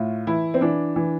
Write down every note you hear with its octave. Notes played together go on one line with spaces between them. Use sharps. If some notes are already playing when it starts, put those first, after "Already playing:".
Already playing: A2 F4
E3 E4
C4
E3 D4
E3